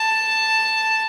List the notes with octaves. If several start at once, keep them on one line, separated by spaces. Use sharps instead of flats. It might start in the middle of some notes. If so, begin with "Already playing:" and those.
Already playing: A5